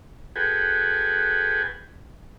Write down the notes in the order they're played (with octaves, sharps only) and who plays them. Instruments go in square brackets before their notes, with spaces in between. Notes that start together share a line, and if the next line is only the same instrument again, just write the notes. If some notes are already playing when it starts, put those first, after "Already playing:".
[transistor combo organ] F#4 G#4 A4 B4 G5 G#5